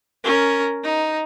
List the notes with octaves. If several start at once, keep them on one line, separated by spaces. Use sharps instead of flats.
C#4 A#4
D#4